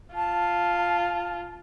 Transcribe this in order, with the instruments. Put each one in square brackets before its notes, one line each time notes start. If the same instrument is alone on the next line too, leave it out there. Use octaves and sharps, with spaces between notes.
[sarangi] F4 [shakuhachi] A5